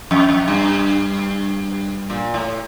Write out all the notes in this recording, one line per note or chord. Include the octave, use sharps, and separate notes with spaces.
F2
F2
G2
A#2
A2